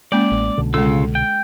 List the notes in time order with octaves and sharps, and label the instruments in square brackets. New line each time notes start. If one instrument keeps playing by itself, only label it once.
[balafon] G#3 A#3 C#4 [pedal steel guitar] D5
[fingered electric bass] A1
C2 B2 D3
[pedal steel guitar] C#3 F4 E6 [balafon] G#3 A4
[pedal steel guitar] G5